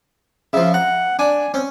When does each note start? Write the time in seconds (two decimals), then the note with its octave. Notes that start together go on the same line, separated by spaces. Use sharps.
0.53 C#3 F3 E5
0.74 F#5 A#5
1.19 D4 G#5
1.54 C4 C#4